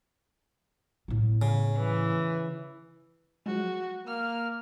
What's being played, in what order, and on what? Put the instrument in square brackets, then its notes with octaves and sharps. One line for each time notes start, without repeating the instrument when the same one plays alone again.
[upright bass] A2 B3
[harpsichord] C#3
[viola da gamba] E3
[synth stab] F3 F#3 G#3 [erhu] F#4
[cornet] A#3 [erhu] F6